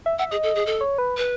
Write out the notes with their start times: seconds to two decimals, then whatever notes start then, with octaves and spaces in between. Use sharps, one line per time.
0.06 E5
0.19 E5 F#5
0.31 G#4 D#5
0.43 A4
0.55 G#4
0.66 A4
0.81 C#5
0.98 B4
1.17 B4